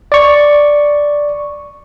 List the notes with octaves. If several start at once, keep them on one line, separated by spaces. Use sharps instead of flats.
D5 C#6